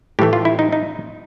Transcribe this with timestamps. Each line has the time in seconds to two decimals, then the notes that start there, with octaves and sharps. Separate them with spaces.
0.19 A2 E3 A3 G4
0.33 F4
0.45 E4
0.59 D#4
0.72 D#4